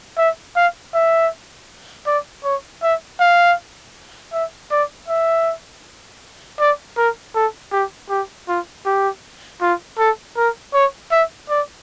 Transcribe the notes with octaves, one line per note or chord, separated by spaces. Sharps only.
E5
F5
E5
D5
C#5
E5
F5
E5
D5
E5
D5
A#4
A4
G4
G4
F4
G4
F4
A4
A#4
C#5
E5
D5